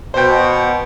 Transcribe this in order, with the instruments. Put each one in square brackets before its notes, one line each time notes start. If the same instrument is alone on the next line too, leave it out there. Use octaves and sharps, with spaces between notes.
[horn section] B2 [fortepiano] C5 G5